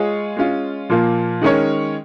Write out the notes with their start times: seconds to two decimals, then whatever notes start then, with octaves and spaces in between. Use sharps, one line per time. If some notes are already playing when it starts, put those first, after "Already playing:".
Already playing: G#3 F4 G#4 C#5
0.37 G#3 C#4 F4
0.89 A#2 F3 A#3 F4
1.41 D#3 G#3 C#4 A#4 C#5